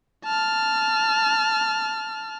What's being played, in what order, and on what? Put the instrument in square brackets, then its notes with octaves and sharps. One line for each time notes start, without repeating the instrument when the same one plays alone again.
[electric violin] A5 F6